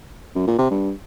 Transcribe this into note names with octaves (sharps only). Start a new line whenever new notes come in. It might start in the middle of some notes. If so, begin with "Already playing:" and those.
F#2
A#2
C3
G2